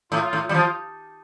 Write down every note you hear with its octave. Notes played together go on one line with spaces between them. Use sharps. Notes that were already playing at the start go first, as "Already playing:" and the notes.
A2 F4
A2
F4
G3
F3